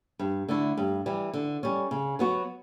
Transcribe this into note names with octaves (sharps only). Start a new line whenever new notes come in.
G2
D3 A3 E4
G2
E3 G3
D3
G3 C#4
C#3
F#3 B3 F#4